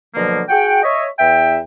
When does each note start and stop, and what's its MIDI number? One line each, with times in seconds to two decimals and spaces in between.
0.15 0.41 47
0.15 0.41 50
0.15 0.41 53
0.15 0.41 54
0.15 0.41 58
0.49 0.83 66
0.49 0.83 68
0.49 0.83 78
0.49 0.83 79
0.83 1.06 73
0.83 1.06 75
0.83 1.06 76
1.19 1.58 40
1.19 1.58 76
1.19 1.58 79